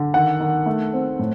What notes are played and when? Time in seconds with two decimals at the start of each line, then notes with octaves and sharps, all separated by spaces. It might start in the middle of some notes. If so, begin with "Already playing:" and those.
Already playing: D3
0.14 D#3 F#5
0.40 D#3
0.66 A3
0.94 C4
1.19 A2